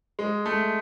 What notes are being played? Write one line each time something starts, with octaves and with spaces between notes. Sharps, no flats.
G#3
A3